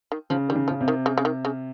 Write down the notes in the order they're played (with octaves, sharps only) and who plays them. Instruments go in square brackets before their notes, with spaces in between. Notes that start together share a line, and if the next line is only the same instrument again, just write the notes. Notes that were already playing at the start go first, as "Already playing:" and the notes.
[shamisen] D#3
[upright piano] C#3 [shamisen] F3
[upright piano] D#3 [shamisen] G3
[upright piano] C#3
[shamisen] F3
[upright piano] C#3
C3
[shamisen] D#3
C#3
C#3
D#3
C#3